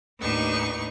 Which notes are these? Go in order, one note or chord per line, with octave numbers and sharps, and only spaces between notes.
D#2 A2 D4 D#4 B4 C#6